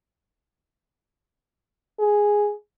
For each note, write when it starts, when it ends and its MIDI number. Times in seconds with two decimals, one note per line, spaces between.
2.00 2.53 68